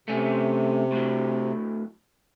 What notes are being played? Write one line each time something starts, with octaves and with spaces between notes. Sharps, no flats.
C3 A3 C#4
A2 F#3